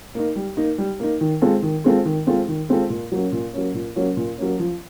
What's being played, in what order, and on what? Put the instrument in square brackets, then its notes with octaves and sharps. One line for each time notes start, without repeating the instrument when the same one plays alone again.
[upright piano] A#3 D#4
G3
A#3 D#4
G3
A#3 D#4
D#3
G#3 C4 F4 A4
D#3
G#3 C4 F4 A4
D#3
G#3 C4 F4 A4
D#3
G#3 C4 F4 A4
A#2
F#3 A#3 C#4
A#2
F#3 A#3 C#4
A#2
F#3 A#3 C#4
A#2
F#3 A#3 C#4
F3